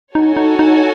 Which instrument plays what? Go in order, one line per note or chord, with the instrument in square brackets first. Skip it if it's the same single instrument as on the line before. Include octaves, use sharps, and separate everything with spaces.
[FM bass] D#4 [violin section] F#4 A4 C#5 G#5
[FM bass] D#4
D#4